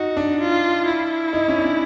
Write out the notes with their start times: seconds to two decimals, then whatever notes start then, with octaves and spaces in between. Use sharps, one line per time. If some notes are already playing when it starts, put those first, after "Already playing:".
Already playing: D#4 F#4
0.17 D4
0.40 F4
0.86 E4
1.33 D#4
1.48 C#4
1.58 D4
1.64 C#4